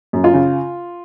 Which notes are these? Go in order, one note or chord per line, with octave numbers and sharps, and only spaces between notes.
F#2
F4
C#3